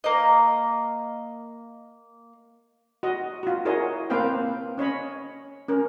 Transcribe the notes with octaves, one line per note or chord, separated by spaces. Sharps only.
A#3 D#5
F#4 D#5
F4 F#4
E4 F#4 G#4 A#4 C#5 D#5
A#3 C4 B4 C5 F5 G5
C#4 C#5 D#5 B5
C#4 A#4